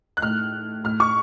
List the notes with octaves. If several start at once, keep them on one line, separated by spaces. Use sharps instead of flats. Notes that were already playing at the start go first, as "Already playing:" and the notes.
F#6
A2 F6
A2 F6
C#6